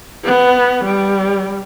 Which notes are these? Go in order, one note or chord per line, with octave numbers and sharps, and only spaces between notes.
B3
G3